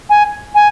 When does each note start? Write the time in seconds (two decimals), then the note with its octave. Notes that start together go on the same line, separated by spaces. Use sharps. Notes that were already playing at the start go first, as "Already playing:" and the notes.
0.10 G#5
0.55 G#5